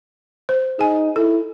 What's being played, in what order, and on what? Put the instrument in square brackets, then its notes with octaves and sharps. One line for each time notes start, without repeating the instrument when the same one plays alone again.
[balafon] C5
[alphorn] D#4 [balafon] G#4 G#5
[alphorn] E4 [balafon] A4